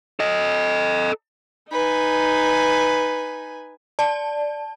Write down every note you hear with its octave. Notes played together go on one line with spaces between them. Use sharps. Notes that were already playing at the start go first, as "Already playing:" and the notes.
A4 D#5
D#4 B4 G#5
D5 A5